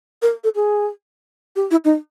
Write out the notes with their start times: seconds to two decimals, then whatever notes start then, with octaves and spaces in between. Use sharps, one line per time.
0.22 A#4
0.44 A4
0.55 G#4
1.56 G4
1.71 E4
1.85 D#4